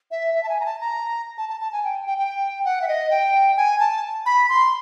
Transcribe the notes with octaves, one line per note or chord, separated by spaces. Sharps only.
E5
E5
A5
G#5
A#5
A5
A#5
A5
A5
A5
G#5
G5
G5
G5
F#5
E5
D#5
G5
G#5
A5
B5
C6